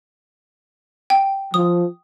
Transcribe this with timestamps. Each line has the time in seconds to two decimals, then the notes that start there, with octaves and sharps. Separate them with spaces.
1.10 G5
1.54 F3 D#6